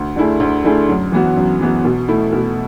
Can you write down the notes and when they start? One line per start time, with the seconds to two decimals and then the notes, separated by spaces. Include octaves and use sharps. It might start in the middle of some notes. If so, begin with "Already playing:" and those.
Already playing: D2
0.16 D3 A3 E4 G#4
0.40 D2
0.65 D3 A3 E4 G#4
0.89 F#2
1.12 E3 B3 F#4
1.36 F#2
1.61 E3 B3 F#4
1.85 B2
2.08 A3 E4
2.33 B2